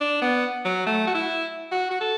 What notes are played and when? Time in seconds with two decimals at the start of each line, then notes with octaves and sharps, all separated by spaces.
0.01 D4
0.22 B3
0.65 F#3
0.86 A3
1.07 F#4
1.15 E4
1.72 F#4
1.91 F#4
2.01 A4